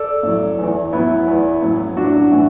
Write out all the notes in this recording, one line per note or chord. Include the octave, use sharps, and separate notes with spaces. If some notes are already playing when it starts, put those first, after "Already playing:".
Already playing: A4 D5
A2 F#3
E2 E3
A2 F#3 B3 E4
E2 E3
A2 F#3
A2 F#3 D4 F#4
A2 E3